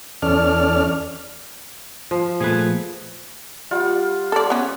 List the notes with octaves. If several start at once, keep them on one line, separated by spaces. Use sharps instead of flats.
E2 C#4 A4 D5 F6
F3
A#2 F3 A3 G#4 B4
G3 F4 F#5
A4 D5
B3 C#4